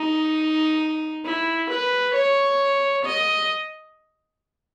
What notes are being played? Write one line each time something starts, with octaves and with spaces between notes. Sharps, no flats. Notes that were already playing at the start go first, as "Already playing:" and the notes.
Already playing: D#4
E4
B4
C#5
D#5